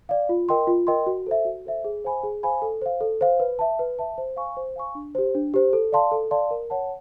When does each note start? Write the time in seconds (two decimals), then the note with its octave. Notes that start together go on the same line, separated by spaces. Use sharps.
0.09 D5 F5
0.29 F4
0.49 A#4 D#5 G5 C6
0.67 F4
0.87 A#4 D#5 G5 C6
1.06 F#4
1.26 A4 C5 E5
1.45 F#4
1.66 A4 C5 E5
1.84 G#4
2.04 C5 F5 G#5 B5
2.23 G#4
2.43 C5 F5 G#5 B5
2.62 A4
2.82 C5 F5
3.01 A4
3.21 C5 F5
3.40 B4
3.59 E5 A5
3.79 B4
3.99 E5 A5
4.18 C5
4.37 F5 G#5 C#6
4.57 C5
4.76 F5 G#5 C#6
4.95 D4
5.15 G4 C5
5.35 D4
5.54 G4 C5
5.73 A4
5.92 D5 F5 A5 C6
6.11 A4
6.31 D5 F5 A5 C6
6.51 A#4
6.70 C#5 F#5 A5